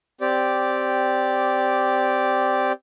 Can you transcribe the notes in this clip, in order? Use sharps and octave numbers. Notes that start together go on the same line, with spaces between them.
C4 G4 D5